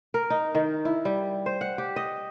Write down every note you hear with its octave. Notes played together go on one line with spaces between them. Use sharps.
A#4
D#4
D#3
E4
G3
C5
F#5
G4
D#5